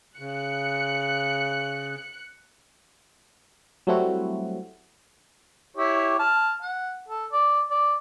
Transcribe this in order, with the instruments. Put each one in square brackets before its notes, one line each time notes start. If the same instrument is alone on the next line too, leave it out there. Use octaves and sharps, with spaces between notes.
[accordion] C#3 [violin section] F#6 C#7
[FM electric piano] F#3 G3 A3 C4 E4 F#4
[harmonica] E4 G4 C#5
A5 F6
F#5
A4
D5
D5